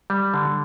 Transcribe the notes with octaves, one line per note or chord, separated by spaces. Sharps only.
G3
D3